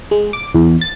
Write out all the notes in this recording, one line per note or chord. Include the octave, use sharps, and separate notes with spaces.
G#3
D6
E2
A6